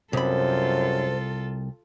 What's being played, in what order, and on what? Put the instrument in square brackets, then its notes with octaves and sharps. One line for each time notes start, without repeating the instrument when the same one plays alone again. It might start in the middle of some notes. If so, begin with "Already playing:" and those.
[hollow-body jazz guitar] C2 B5 [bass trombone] F#2 [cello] F4 A4 [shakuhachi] C5